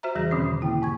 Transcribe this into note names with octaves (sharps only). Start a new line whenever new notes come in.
F#4 C5 E5 A#5
E2 C#3 E3 G3 G#4 A#6
B2 D3 D#3 C4 C#4
C#3
A#3 E4 G5
G#2 C#6 G#6